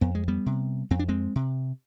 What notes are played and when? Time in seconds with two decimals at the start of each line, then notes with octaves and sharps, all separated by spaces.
0.01 F2 B3
0.15 G#3
0.28 G3 B3
0.46 C3
0.91 F2 C4
0.99 D4
1.08 G#3 C4
1.36 C3